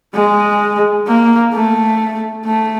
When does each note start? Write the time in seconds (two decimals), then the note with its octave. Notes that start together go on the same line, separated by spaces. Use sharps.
0.14 G#3
1.07 A#3
1.53 A3
2.46 A3